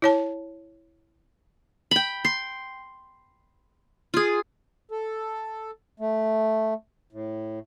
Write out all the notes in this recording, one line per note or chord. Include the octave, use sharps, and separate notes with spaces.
E4 C#5 A5
G5 B5
C6
F4 G#4
A4
A3
A2